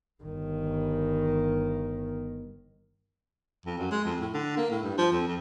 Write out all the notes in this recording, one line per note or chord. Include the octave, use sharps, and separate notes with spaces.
G1 D#3
F2
F#2
G#3
F2
A2
D3
A#3
A2
G2
F3
F2
F2